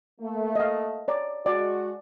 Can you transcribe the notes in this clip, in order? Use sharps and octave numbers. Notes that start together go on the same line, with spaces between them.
A3 A#3
D#5 F5
C#5 D5 A#5
G#3 F#4 D5